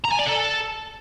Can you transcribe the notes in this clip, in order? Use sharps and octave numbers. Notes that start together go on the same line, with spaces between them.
A#5
G#5
D5
A4